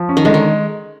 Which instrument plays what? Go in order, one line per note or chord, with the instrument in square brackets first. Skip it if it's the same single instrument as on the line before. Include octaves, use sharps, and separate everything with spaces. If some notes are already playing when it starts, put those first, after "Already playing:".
Already playing: [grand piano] F3
C#4
[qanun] D#3
[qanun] D3 [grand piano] G#3
[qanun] D#3